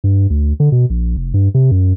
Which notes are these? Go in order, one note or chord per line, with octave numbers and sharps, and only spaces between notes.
G2
D2
D3
B2
A#1
F1
G2
C3
F#2